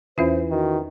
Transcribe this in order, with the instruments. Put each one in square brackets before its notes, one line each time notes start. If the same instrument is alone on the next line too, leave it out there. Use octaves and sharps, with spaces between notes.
[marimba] E2 C#4 F4 [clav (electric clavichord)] E3 [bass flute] C5
[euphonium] D#3 [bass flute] F#4